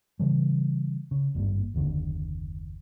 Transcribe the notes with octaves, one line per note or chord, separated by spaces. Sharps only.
C#3 E3 G3
C#3
G#1 G2 G3 A#3
F#1 D#2 D3 D#3